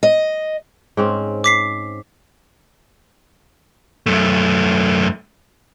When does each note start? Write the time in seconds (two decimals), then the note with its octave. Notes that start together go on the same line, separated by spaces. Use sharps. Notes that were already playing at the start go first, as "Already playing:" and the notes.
0.03 D#5
0.97 G#2 C4 C#4
1.44 D6 B6 C7
4.06 F#2 A3